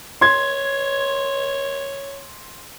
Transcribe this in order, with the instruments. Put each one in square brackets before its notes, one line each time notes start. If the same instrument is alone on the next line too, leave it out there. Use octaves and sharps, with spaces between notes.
[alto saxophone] C#5 [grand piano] C6 G#6